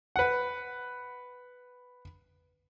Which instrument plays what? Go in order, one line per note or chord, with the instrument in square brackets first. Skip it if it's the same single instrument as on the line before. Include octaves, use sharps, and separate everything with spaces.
[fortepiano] B4 F#5